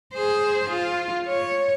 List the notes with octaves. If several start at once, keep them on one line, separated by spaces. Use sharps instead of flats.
G#4 C5
F4
C#5